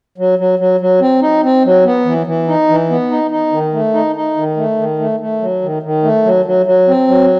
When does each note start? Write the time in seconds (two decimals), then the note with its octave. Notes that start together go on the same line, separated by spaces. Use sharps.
0.18 F#3
0.39 F#3
0.59 F#3
0.80 F#3
1.01 C4
1.22 D#4
1.44 C4
1.65 F#3
1.85 B3
2.05 E3
2.26 E3
2.48 D#4
2.69 E3
2.90 B3
3.11 D#4
3.31 D#4
3.52 D#3
3.73 A3
3.94 D#4
4.16 D#4
4.37 D#3
4.57 A3
4.78 D#3
4.99 A3
5.20 A3
5.41 F#3
5.62 D#3
5.83 D#3
6.03 A3
6.25 F#3
6.45 F#3
6.66 F#3
6.88 C4
7.08 F#3